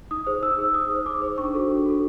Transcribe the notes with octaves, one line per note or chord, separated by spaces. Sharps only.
D#4 D#6
G#4 C5
D#4 E6
G#4 C5
D#4 D#6
G#4 C5
D#4 D6
G#4 C5
D4 C#6
F#4 A4
D4
F#4 A4